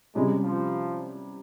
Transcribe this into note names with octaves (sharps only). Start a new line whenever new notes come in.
C3 G3 G#3 C#4
F3